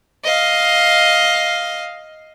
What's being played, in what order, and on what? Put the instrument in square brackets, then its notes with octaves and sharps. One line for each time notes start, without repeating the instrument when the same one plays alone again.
[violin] D#5 F5